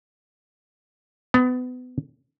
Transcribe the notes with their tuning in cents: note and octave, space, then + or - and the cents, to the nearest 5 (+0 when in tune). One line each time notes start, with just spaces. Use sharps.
B3 +30